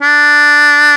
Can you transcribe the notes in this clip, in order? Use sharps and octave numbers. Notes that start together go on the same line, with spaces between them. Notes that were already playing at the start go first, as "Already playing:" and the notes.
D4